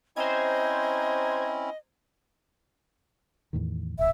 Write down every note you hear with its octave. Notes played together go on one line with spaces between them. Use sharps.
C4 C#4 E4 C5 D#5 A#5 G#6
E2 A2 D#3
D1 A#1 E5